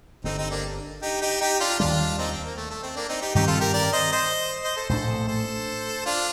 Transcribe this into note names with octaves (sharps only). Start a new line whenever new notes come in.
G1 G2 D3 C4 D#4
C4 D#4
A#3 D4
D#4 G4
D#4 G4
D#4 G4
D4 F4
D#2 D#3 G3 D4 F4
C4 D#4
C4
A#3
A3
A3
C4
A#3 D4
C4 D#4
D#4 G4
G2 D#3 G3 C4 D#4 G4
F4 A4
G4 A#4
A#4 D5
C5 D#5
C5 D#5
C5 D#5
A4 C5
A#1 A2 A3 D4 A4 C5
A4 C5
D4 F4